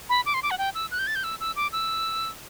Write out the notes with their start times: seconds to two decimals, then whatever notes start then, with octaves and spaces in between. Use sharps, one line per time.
0.09 B5
0.26 D6
0.34 C6
0.43 D6
0.51 F#5
0.58 G5
0.75 E6
0.91 F#6
0.99 G6
1.07 A6
1.15 G6
1.24 E6
1.40 E6
1.56 D6
1.72 E6